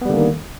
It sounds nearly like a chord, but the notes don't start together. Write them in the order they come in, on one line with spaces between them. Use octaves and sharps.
B3 G3 D3 A#3 D#3